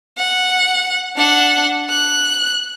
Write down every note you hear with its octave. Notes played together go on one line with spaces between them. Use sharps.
F#5
D4 F#5
F#6